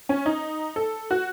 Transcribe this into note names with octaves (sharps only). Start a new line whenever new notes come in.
C#4
D#4
A4
F#4